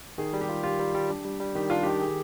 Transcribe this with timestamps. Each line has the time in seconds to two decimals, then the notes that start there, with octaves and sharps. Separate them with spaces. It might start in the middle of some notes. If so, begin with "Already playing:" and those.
0.18 D#3 G#4
0.33 G3
0.41 G4
0.49 F4
0.63 F4 G4
0.79 G3
0.95 G3
1.10 D4
1.25 G3
1.40 G3
1.55 D#3 G4
1.70 D4 F4
1.83 D#3 G4
2.02 G#4